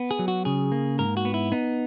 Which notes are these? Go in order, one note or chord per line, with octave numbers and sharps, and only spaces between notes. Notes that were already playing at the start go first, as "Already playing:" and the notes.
Already playing: B3
G#4
F#3
F#4
C#3 G#4
A#3
G#2 A#4
F#4
B3
E4
B3 D#4